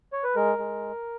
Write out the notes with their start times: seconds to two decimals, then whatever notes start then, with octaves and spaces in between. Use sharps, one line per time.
0.13 C#5
0.24 B4
0.36 G#3 A#4
0.58 G#3